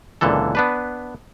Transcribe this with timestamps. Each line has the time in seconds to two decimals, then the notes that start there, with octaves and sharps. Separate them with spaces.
0.21 C#2 A#2 D3 E3 A4
0.55 B3 D4 B4